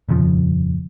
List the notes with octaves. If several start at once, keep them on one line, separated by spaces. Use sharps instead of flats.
D#1 F2 C#3 F3